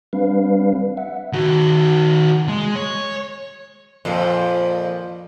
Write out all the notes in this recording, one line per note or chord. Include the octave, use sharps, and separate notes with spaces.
G3 C4 D4 B4 F5
E5 F#5
D#3 F#4
G#3
C#5
F2 A#2 F3